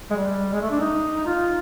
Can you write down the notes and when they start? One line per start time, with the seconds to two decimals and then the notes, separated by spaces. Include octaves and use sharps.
0.11 G#3
0.16 G3
0.53 G#3
0.62 A3
0.71 D4
0.80 D#4
1.26 F4